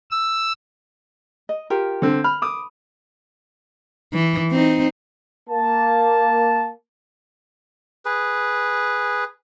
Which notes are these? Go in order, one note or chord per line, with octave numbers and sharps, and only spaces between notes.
E6
D#5
F4 G4 A#4
D3 C4
B5 F6
D6 D#6
E3
C4 D#4
A#3 A5
G#4 B4